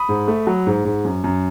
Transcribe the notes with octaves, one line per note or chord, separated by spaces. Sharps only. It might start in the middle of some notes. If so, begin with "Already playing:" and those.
Already playing: B5 D#6
G#2
A3
F#3
G#2
G#2
F#2
F#2